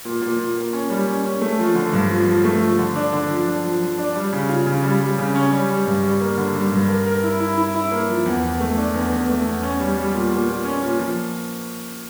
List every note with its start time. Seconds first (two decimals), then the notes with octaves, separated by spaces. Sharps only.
0.05 A#2
0.22 A#2
0.39 A#2
0.56 A#2
0.73 C#4
0.90 G3
1.07 C#4
1.25 C#4
1.42 A3
1.59 F3
1.75 D3
1.93 G2
2.10 F3
2.27 F3
2.44 A3
2.62 F3
2.79 D3
2.96 D4
3.13 D3
3.30 F3
3.47 D4
3.64 F3
3.81 F3
3.98 D4
4.16 G3
4.33 C#3
4.49 F4
4.67 C#3
4.84 G3
5.01 G3
5.18 C#3
5.35 C#4
5.52 G3
5.69 G3
5.87 G2
6.03 G3
6.21 A#3
6.38 D3
6.55 G3
6.72 G2
6.89 A#4
7.06 A#4
7.23 E4
7.40 E4
7.57 E4
7.75 E4
7.92 A#3
8.09 F3
8.26 E2
8.43 E2
8.60 A3
8.77 D4
8.94 E2
9.11 E2
9.29 A3
9.46 E2
9.63 C#4
9.80 G3
9.97 G3
10.14 A#2
10.31 A#2
10.48 A#2
10.65 C#4
10.82 A#2
10.99 F3